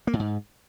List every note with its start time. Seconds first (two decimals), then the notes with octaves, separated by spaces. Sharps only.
0.07 A#3
0.13 A2
0.19 G#2